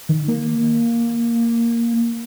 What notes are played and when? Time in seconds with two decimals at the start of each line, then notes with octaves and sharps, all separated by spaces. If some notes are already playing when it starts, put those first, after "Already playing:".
0.09 D#3
0.28 A#3